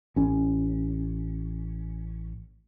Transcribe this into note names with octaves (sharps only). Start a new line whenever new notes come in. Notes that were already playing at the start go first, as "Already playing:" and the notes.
A1 C#4